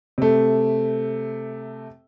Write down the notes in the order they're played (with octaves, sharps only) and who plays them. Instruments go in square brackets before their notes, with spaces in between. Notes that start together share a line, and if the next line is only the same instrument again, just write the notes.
[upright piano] C3 A3